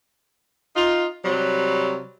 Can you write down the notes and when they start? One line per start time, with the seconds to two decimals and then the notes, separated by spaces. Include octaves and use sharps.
0.76 D#4 F4
1.24 C3 F#3 G3